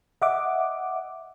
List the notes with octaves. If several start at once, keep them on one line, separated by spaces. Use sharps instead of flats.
D#5 E5 F#5 D6